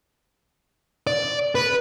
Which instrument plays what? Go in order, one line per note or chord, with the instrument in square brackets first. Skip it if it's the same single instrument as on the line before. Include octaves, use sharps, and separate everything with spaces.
[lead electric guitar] D5
B4